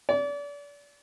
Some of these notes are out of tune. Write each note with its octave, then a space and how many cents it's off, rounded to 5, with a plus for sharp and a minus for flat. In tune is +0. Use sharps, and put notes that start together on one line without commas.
D5 -35